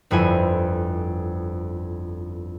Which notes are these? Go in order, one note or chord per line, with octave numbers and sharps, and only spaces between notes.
G1 F2 E4 G#5